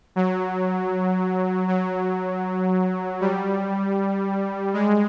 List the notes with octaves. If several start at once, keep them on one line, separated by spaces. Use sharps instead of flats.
F#3
F#3
G3
G#3